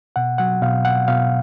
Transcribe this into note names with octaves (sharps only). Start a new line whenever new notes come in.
B2 F#5
F#3 F#5
B2 F5
B2 F#5
B2 F5